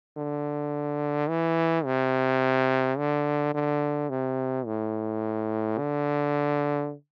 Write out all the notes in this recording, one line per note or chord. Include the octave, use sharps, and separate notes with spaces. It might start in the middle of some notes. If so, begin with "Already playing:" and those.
D3
E3
C3
D3
D3
C3
A2
D3